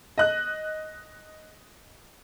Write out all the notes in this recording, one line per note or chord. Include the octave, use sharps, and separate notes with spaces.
D#5 F#6